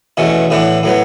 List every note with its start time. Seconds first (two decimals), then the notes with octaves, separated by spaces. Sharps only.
0.17 E2 B2 A3 C#4
0.50 A2 E3 B3 D4
0.83 A2 F#3 B3